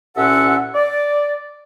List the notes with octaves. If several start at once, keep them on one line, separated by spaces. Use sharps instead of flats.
C2 A#2 C#4 A4 E5 F#5
D5